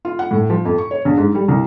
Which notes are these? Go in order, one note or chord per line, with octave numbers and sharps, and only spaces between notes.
F4
F#5
A2
F3
F2
C#6
C#5
A#1
G#2
G3
C2